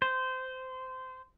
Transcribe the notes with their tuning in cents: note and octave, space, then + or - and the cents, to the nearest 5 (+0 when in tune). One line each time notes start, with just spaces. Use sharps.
C5 -20